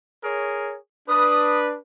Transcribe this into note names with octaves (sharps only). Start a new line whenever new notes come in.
G#4 A#4 C#5
D4 B4 D#6